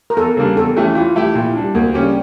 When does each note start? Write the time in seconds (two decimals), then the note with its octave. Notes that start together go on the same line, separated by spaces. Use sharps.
0.10 A#4
0.16 E2 A4
0.37 C#3 G3 A#3 D4
0.56 E2 A4
0.77 E3 A3 C#4 G4
0.95 E3 F4
1.16 A3 E4 G4
1.35 A#2 E4
1.55 G3 D4
1.75 D2 A#3
1.94 C#3 G3 C#4 G4
2.01 D4